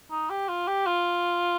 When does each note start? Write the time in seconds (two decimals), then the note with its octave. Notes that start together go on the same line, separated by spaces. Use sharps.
0.11 D#4
0.30 G4
0.49 F4
0.67 G4
0.86 F4